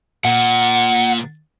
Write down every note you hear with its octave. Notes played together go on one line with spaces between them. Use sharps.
A#2 F#5